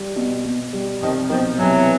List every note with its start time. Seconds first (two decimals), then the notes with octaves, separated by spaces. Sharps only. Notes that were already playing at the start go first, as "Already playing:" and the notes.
Already playing: G3
0.16 B2
0.44 B2
0.73 G3
1.02 C2 D#3 F3
1.30 B2 D#3 F3
1.58 C2 E3 F#3